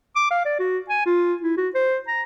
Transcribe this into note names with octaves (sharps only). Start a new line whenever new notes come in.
D6
F5
D5
F#4
G#5
F4
E4
F#4
C5
A#5